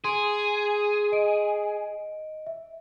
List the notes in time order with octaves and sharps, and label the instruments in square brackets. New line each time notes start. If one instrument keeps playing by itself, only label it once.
[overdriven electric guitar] G#4 [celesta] C6 D7
[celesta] D#5 D7
E5